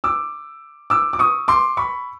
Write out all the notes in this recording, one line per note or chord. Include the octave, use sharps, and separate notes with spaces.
D6 E6
D6 E6
D6
C#6 D#6
C6 D6
B5 C#6